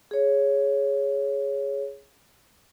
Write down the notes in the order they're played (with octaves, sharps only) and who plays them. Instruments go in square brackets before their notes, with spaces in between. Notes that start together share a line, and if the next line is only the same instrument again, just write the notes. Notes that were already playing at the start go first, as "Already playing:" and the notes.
[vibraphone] G#4 C#5